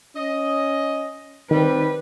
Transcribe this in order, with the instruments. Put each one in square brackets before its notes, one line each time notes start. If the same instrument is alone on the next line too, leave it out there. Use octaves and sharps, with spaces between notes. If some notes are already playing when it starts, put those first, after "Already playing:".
[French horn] C#4 [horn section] D#5
[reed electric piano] D#3 [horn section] G3 [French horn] C4 [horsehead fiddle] B4